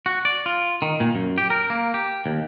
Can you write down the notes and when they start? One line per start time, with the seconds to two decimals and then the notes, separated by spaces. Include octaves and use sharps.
0.06 F#4
0.25 D5
0.46 F4
0.82 D#3
1.00 A#2
1.15 F#2
1.38 G4
1.50 A#4
1.70 A#3
1.94 G4
2.26 D#2